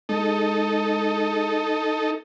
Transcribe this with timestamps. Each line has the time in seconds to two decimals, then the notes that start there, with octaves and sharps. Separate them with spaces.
0.09 G#3 D#4 A4